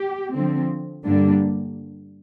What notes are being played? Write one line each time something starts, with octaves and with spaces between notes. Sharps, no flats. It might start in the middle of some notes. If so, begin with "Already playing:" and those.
Already playing: G4
D3 F3 C4
G2 D3 G3 A#3 D4